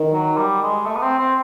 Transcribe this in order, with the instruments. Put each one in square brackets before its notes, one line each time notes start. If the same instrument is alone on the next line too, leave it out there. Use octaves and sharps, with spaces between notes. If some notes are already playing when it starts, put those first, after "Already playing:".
Already playing: [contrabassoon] D#3
[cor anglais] F#3
G3
G#3
A3
B3
C4
C4